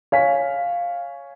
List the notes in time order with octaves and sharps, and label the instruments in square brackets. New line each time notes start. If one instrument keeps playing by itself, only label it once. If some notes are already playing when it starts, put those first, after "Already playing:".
[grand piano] C#5 G#5 B6 [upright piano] F5